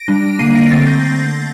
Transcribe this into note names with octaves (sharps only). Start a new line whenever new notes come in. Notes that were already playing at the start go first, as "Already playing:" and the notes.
Already playing: A#6 D7
G3 D4
D3 G3 A#3 D4 C7 D#7
A#6 D7
D3 A3 C4 A6 C7
G6 A#6